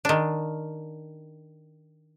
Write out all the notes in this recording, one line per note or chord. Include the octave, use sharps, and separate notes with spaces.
D#3 D4